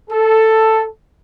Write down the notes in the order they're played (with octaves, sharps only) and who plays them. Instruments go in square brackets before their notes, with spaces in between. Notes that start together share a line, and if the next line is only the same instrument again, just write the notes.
[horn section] A4